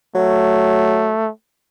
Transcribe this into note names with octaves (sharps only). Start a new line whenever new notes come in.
F#3 A3